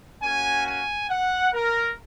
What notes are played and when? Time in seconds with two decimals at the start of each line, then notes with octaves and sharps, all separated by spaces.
0.21 A#3 C#4 F#4 G#5
0.64 G#5
1.09 F#5
1.53 A#4